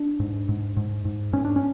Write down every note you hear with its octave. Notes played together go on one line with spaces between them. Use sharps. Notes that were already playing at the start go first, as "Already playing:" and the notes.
Already playing: D4
G#2
G#2
G#2
G#2
G#2 C#4
D4
C#4